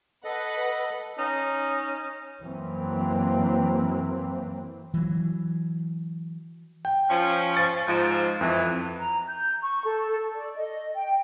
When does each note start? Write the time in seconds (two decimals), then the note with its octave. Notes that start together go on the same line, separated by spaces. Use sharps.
0.24 A4 B4 D#5 F#5
1.19 C#4 D#4
2.41 F#2 E3 F#3 A#3 C4
4.94 E3 F#3
6.85 G5
7.10 F3 C#4
7.57 A6
7.88 G#2 F3
8.41 F2 E3
9.00 A#5
9.28 G6
9.62 C#6
9.84 A4
10.36 D5
10.56 D#5
10.96 G5